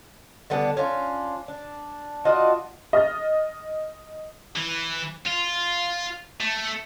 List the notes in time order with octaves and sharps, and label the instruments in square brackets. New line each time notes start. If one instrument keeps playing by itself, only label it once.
[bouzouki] D3 G3 B3 D4
C#4 D4 F4
D4
D4 F4 F#4 D#5
[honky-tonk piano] D#5 F6 A6
[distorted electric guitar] E3
F4
A3